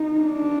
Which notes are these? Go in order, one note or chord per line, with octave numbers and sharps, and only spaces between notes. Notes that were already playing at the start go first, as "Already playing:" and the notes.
Already playing: D#4
D4